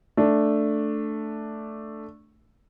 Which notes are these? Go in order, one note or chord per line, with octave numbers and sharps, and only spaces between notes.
A3 D4